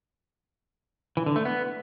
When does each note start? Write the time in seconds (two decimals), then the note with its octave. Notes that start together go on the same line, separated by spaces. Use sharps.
1.17 E3
1.26 D3
1.36 A3
1.45 B3